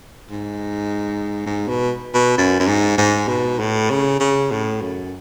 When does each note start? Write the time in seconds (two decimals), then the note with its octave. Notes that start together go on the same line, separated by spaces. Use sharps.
0.31 G#2
1.46 G#2
1.68 B2
2.14 B2
2.38 F#2
2.59 F#2
2.68 G#2
2.98 G#2
3.28 B2
3.60 A2
3.90 C#3
4.20 C#3
4.51 A2
4.81 F#2